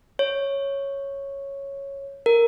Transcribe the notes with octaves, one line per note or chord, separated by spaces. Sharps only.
C#5
A#4